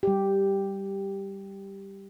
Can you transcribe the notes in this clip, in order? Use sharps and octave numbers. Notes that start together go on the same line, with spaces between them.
G3 G4